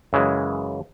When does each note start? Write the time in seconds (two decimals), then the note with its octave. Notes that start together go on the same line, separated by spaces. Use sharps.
0.13 F#2 C#3 E3 G#3